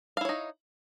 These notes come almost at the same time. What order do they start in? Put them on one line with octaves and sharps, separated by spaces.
F5 E4 C#5 D#4